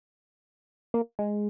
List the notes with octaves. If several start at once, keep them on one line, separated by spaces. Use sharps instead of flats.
A#3
G#3